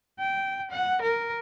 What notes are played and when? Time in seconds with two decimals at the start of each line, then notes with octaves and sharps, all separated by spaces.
0.19 G5
0.71 F#5
1.02 A#4